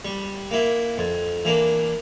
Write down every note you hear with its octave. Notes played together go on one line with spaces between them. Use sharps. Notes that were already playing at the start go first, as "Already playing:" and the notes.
G3
A#3 E4
F2
E3 A#3 D4